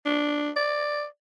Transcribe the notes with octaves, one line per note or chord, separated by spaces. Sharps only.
D4
D5